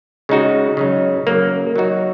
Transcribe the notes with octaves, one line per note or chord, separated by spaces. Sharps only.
C#3 G#3 D#4 F#4
C#3 F#3 D#4
C#3 F#3 A#3
F#3 D#4 F#4